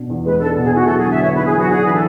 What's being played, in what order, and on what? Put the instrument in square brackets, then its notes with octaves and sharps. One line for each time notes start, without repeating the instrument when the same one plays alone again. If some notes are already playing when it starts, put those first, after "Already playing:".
Already playing: [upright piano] B2 D4
E2
[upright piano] G#3 [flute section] B4
[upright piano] D4 [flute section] A4
[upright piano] B2 [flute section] G#4
[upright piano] E4 [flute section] F#4
[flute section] A4
[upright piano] F#3
[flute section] G#4
[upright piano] D3 [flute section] E5
[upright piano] B3 [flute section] C#5
[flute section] B4
[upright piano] E4
[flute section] G#4
[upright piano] F#3 [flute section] F#4
[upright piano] D4 [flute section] G#4
[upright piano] E3 [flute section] B4
[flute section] A4